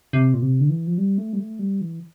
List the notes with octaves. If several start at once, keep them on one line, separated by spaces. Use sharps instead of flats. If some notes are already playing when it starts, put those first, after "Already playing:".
C3
A#2
C3
D3
E3
F3
G3
A3
G3
A3
G3
E3